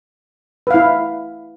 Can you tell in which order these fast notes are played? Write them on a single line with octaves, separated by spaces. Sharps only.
B4 F5 E4